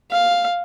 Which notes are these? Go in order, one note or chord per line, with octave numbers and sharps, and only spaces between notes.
F5